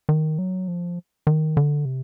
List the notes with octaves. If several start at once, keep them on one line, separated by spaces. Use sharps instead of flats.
D#3
F#3
F3
D#3
D3
C3